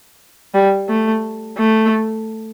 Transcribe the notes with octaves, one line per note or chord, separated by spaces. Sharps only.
G3
A3
A3